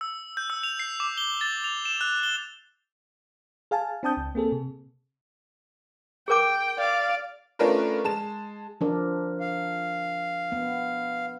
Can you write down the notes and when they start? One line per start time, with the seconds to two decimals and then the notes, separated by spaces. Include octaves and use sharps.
0.01 E6
0.37 G6
0.50 E6
0.63 F7
0.80 C7
1.00 D6
1.18 G7
1.41 A6
1.64 F7
1.85 E7
2.01 F#6
2.23 G7
3.71 G#4 F5 G#5 A5
4.03 C4 D4 G5 A5 D#6 G6
4.17 C#2
4.35 A#3 C4 G#4 A4
4.52 C3
6.28 G#4 A#4 G5 D6
6.79 D5 F5
7.59 A3 C#4 D4 F4 A#4 B4
8.04 G#3 A5 E7
8.81 F3 D4 A#4
9.41 F5
10.52 B3